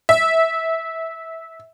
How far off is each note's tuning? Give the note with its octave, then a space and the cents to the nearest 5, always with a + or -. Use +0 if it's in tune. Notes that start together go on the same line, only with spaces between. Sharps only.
E5 -15